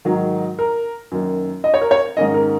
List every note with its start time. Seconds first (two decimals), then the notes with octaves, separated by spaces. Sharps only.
0.05 G#2 D#3 F#3 D#4
0.59 A#4
1.11 F#2 D#3 A#3
1.64 D#5
1.74 C#5
1.81 A#4
1.91 C#5
2.17 G#2 D#3 A#3 C#4 D#5
2.34 A#4